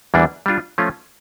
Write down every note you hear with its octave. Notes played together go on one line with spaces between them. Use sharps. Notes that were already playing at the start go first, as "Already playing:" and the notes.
E2 E3 G3 A#3 D4
G3 D4 F4
F3 A3 C#4 F4